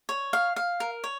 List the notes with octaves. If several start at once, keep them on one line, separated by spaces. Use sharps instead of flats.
C#5
F5
F5
A#4
C#5